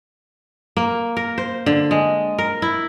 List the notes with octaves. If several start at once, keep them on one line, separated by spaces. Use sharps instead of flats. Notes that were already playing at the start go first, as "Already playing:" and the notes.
A#3
A#4
C5
D3
G#3
A#4
E4